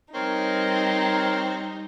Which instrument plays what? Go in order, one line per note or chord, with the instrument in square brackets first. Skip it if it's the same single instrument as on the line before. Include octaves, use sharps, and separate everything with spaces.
[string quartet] G3 D#4 [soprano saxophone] C4 [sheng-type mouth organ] A#4 C#5